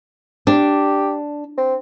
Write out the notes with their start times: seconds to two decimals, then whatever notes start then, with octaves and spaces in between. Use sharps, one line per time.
0.47 D4 G4
1.58 C4